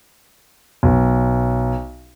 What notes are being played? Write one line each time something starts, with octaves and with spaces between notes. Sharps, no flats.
B1